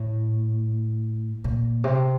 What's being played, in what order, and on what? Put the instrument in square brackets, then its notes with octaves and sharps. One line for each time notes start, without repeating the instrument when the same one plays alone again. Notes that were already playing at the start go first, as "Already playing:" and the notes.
Already playing: [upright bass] A2
A#2
C3